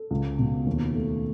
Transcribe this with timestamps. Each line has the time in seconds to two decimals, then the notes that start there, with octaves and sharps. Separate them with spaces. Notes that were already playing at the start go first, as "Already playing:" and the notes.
Already playing: A4
0.11 C#2
0.39 B2
0.67 D#2
0.94 A3